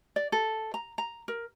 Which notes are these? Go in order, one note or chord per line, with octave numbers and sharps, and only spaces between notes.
D5
A4
A#5
A#5
A#4